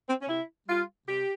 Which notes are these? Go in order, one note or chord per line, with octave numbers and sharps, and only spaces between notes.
C4
C#4
C3 E4
G3 F4
C3 G4